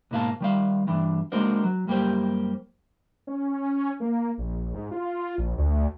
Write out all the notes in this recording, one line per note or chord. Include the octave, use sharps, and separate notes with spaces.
G#2 B2 A#3 E4 F5 A5
D#3 G3 F5
G2 E3 D4
G#3 A#3 D4 F#4 A#4 C5
F#3
F#2 G3 A#3 G4 C5
C#4
A#3
A#1
G#2
F4
A#1
D2